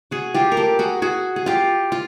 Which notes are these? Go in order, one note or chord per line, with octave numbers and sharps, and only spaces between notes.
F#4 G#4
F4 G4
A#4
G4 A4
F#4 G#4
F#4 G#4
G#4
F4 G4
F4